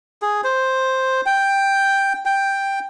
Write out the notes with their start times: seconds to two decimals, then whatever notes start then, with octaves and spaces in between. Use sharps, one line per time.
0.22 G#4
0.44 C5
1.26 G5
2.25 G5